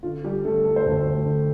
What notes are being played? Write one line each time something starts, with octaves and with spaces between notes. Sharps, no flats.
D3 F4
G3 G4
D3 A3 A4
A4
C5
D2 A3 A4
D3